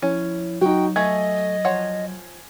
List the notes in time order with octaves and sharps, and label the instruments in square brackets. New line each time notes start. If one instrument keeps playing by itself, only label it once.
[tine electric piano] F3 E4 C#5 [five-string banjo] C#4
[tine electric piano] F#3 [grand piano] D#4 F#4 [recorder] G5
[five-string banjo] A3 [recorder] D#5 [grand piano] G#5 G#6
[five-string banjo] F3 C#5 F#5